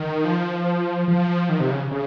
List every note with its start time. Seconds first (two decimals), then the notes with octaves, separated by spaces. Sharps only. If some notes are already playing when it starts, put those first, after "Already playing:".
Already playing: D#3
0.25 F3
1.08 F3
1.49 D#3
1.60 C3
1.70 C#3
1.91 C#3